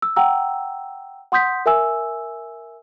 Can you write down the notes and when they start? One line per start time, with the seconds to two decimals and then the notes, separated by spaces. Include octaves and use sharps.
0.02 E6
0.16 F#5 G5 A#5 E6
1.32 F#5 C6 D#6 G6 B6
1.66 A#4 E5 G#5 E6